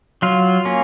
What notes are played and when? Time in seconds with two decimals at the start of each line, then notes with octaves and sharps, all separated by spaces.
0.22 F#3 F4
0.65 A#3 C#4